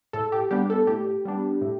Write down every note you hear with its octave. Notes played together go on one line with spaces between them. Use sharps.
A2 A4
G4
G3 B3 D4 G4
A4
A2 G4
G3 B3 D4
A2